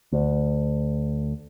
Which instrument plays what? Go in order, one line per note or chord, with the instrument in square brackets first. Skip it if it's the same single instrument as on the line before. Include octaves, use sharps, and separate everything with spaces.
[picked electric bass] D2